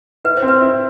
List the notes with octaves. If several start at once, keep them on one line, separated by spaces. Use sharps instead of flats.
E4 B4
C5
C4
B4
E4